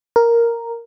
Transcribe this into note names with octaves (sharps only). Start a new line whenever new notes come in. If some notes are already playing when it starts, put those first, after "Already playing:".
A#4